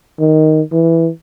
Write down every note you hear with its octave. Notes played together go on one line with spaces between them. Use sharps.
D#3
E3